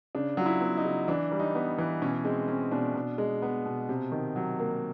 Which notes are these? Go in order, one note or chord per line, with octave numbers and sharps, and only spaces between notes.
C#3 D4
F#3 F4
E4
B3
D#4
C#3
E3 D4
G3
D#4
B3
E3
B2 C#4
G#3 C4
C4 C#4
B2 D4
B2
G#3
B3
B2
C3
D#3
F#3
A#3